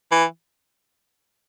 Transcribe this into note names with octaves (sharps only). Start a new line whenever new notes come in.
E3